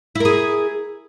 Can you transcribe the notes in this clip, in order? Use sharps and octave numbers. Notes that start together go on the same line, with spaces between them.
E4 G#4 A#4